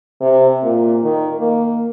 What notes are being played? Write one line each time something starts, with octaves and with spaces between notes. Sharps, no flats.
C3
A#2
D#3
A#3